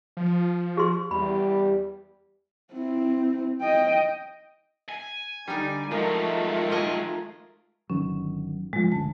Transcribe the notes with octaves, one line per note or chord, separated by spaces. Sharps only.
F3
G#4 C6
E2 G3 B5
C4 E4
D#5 G5
G#5
D3 G3 D#4 D5
D#3 F3 F#3 G#3 A3 F4 A#4
A#4 D#5 G#5
G1 D#3 F#3 C#4
A2 F3 G#3
G1 D2 C#3 A5